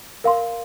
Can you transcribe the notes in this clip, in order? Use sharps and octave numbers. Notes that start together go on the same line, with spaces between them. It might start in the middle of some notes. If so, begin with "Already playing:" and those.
A#4 F5 C6